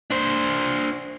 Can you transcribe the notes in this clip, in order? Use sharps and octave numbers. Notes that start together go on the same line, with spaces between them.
D4 C5